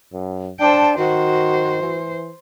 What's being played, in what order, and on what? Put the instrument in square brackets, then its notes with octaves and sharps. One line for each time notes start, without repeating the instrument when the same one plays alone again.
[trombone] F#2
[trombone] D4 [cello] C5 G5 [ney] A5
[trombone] D#3 [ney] F#4 [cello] C5
[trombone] E3